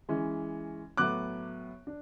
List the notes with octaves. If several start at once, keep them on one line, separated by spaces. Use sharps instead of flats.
E3 G#3 C#4
A2 F#3 B3 D6 F#6
D4